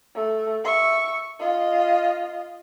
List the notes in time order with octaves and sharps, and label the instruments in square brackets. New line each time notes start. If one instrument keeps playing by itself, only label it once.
[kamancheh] A3
E5 C#6
F4 D#5